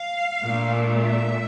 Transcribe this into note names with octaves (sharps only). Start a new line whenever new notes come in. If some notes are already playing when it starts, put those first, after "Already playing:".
Already playing: F5
A#2 A3 D4
E5